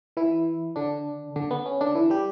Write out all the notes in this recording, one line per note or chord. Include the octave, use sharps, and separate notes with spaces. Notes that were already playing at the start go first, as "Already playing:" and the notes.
E3 E4
D3 D4
D3 D4
B3
C#4
D3 D4
E3 E4
G3 G4